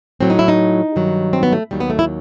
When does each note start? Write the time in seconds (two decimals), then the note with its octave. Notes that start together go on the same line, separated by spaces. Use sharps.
0.21 A2 F#3 C4
0.30 D#4
0.39 E4
0.48 D#4
0.96 G2 D#3 F#3
1.33 C4
1.43 B3
1.53 A3
1.71 D#2 D#3 F#3 G3
1.80 B3
1.90 A3
1.99 E4